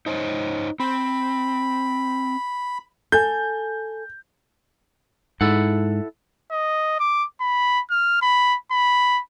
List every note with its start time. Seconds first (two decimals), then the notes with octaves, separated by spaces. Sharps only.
0.06 D#4 C5 C#5
0.80 C4 B5
3.12 A4 G#5 G6
5.41 G#2 E4 A4 F#5
6.51 D#5
6.99 D6
7.41 B5
7.90 F6
8.22 B5
8.72 B5